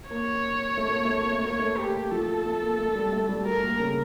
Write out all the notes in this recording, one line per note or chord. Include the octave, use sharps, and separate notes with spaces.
A#3 C#5
A3
A#3
A3
A#3
A3
A#3 C#5
A3
G4
F3 A4
A3
A#3
A3
G3
A3
G3
G3 A#4
A#3
C#3